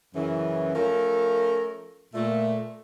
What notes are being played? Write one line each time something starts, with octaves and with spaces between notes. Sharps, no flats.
F#2 C#3 E3
F3 A3 C#4 A4 A#4
A#2 A3